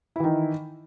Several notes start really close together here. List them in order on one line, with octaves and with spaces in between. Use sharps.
E4 E3 D#3